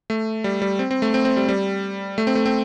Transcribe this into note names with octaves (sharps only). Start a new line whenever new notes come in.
A3
G3
G3
C4
C4
A3
C4
C4
G3
G3
A3
C4
A3
C4